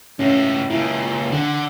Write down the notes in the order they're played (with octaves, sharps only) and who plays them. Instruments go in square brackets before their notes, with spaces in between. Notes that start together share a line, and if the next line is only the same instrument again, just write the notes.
[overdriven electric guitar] C#2 A2 [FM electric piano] C#4
[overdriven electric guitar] C#2 A#2 [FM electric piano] E4
[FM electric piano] A#5
[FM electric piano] D3 [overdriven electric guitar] D4 F#5